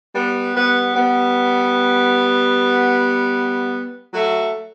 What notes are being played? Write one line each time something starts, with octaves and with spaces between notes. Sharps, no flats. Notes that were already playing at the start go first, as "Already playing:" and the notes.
G3 B3
G3 B3
G3 B3
F#3 A3